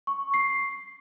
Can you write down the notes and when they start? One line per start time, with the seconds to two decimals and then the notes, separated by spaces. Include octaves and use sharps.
0.07 C#6
0.34 C7